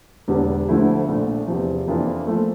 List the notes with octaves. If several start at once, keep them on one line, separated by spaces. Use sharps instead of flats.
E1 E2 D3 G3 D4
D2 D3 F3 A3 E4
A#1 A#2 A3 D4
E2 C3 F3
F2 E3 A#3 D4 F4
F3 A3